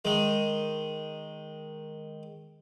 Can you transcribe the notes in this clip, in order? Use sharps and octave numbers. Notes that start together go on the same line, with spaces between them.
D#3 G#3